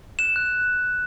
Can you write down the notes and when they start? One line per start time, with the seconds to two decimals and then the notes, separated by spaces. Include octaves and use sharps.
0.19 F#6 E7
0.36 F#6